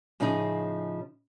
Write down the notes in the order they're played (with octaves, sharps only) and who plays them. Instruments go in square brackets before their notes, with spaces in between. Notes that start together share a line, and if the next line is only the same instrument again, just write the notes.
[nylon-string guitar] A2 C#3 F3 C#4 D#4 G#4